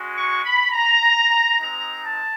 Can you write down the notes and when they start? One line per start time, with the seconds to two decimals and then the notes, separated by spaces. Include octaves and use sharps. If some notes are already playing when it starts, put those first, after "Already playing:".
Already playing: G#3 C#4 F#4
0.14 C#6
0.43 B5
0.72 A#5
1.60 G#3 C4 D#4 A#5
2.03 A5